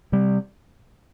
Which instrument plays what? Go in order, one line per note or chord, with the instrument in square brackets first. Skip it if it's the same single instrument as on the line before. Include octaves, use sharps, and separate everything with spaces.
[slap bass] C3 G3